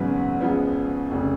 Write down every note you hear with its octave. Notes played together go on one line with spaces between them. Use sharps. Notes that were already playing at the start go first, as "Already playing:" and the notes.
Already playing: G#1 F#2 C#3 F#3 B3
C#2 C#3 F3 B3
F1 C#3